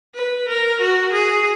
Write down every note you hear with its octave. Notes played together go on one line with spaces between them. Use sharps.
B4
A#4
F#4
G#4